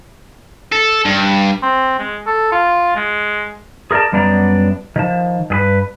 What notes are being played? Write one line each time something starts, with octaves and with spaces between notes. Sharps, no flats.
A4
G2
C4
G#3
A4
F4
G#3
G#4 A#4 C#5 D5 A5
F#2 G3 B3 D4 D5 A#5
D#3 F3 A5
G2 G#4 B4